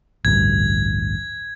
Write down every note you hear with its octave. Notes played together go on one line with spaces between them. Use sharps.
A1 D2 G2 G#6